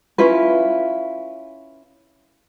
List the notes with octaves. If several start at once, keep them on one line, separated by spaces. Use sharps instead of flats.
C#4 E4 F4 B4